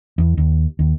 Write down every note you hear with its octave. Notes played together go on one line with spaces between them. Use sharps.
E2
D#2
D#2